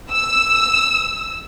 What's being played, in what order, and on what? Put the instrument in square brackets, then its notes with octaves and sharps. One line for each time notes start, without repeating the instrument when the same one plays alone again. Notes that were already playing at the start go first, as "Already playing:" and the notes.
[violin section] E6